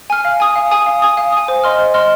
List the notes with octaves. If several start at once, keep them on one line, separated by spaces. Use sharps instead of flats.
G#5 F6
F5
G#5 D#6
F5
G#5 D#6
F5
G#5 D#6
F5
G#5 D#6
C5
D#5 C6 F6
C5
D#5 C6 F6